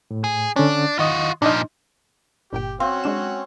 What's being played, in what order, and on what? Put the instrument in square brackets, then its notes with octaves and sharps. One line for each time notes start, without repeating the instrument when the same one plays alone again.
[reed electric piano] A2
[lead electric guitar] G#4
[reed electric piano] D3 C#4 [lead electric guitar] D4
[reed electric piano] D#3 D#5 D#6 [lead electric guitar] F4 F#4
[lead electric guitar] A#2 F3 [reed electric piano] D4 D#4 D#5
[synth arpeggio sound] G1 A#2 G5 [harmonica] G4
[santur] C4 [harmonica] C#4 F#4 [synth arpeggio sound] F5
[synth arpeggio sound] G#3 D4 E7